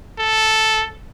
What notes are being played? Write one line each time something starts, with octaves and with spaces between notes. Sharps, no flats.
A4